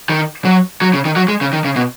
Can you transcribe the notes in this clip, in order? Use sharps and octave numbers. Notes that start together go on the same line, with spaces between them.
D#3
F#3
F#3
C#3
D#3
F#3
G#3
C#3
D#3
C#3
B2